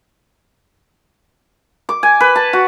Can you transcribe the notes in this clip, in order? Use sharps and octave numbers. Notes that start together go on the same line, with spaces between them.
D6
G#5
B4
A5
F#4